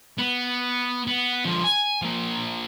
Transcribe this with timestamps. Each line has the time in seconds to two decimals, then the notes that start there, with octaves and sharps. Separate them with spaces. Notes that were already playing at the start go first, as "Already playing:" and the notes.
0.18 B3
1.07 B3
1.45 D3 F3
1.64 G#5
2.02 F3 A#3